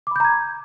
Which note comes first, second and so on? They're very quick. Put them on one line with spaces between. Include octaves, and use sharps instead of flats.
D6 B5 G6 A#5 G#6